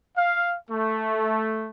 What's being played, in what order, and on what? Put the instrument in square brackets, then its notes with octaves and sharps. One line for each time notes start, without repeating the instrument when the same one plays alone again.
[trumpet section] F5
A3